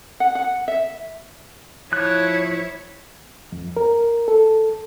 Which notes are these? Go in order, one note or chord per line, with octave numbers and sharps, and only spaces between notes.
F#5
F#5
E5
F3 E4 C#5 F#6
F2
A#4
A4